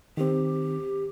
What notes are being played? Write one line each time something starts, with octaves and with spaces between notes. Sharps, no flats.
D#3 C4 G4